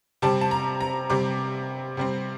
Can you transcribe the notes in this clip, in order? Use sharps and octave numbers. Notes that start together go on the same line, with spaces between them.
C3 G3 C4 A5
A5
A#5
A#5
C3 G3 C4 D6
C3 G3 C4